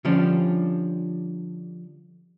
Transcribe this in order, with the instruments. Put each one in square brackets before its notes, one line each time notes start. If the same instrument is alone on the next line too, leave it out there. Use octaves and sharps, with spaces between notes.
[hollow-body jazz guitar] D3 F3 G3 C#4 D4